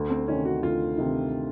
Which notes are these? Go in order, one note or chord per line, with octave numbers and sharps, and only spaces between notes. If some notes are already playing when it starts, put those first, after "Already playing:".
Already playing: D2
C4
C3 D#3 C#4
F#4
D2 F4
C3 D#3